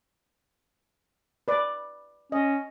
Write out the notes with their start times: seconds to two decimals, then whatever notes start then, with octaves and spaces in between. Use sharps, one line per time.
1.48 B4 D5
2.32 C#4 D#5